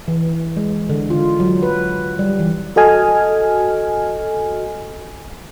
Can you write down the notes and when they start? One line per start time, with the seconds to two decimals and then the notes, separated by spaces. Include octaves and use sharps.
0.08 E3
0.57 G#3
0.90 D3
1.10 F4
1.40 F#3
1.63 B4
2.19 G3
2.39 E3
2.76 F#4 A4 D#5 G#5 F6